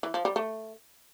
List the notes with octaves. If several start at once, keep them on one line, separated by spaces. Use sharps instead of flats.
E3
F3
G3
A3